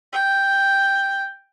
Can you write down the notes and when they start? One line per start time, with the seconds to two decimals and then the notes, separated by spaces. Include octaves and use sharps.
0.13 G5